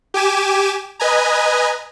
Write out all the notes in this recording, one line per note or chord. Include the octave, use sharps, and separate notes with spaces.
G4 G#5 D6 E7
B4 D#5 G#5 A#5